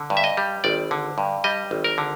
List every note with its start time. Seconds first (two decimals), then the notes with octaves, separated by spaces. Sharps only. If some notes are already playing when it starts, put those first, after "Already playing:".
Already playing: D3
0.10 G2
0.17 E5
0.24 D#5
0.37 G3
0.64 G#1 D5
0.91 D3
1.18 G2
1.44 G3 D#5
1.71 G#1
1.84 A#4
1.98 D3